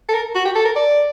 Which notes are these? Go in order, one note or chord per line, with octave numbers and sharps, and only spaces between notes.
A4
A#4
F#4
G4
A4
A#4
D5